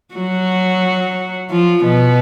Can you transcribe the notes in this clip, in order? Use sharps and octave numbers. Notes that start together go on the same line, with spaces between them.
F#3 F#4
F3 F4
B2 B3